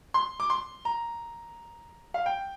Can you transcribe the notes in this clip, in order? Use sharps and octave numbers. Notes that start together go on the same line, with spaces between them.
C6
D6
C6
A#5
F5
G5